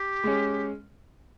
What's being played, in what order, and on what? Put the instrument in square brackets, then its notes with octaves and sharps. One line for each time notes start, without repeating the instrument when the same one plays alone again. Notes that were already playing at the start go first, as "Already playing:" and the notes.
Already playing: [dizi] G4
[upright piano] G#3 C#4